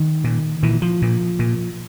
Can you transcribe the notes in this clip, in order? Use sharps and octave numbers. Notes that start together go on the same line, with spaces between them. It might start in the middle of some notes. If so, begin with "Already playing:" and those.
Already playing: D#3
A#2
A#2 E3
F3
A#2
A#2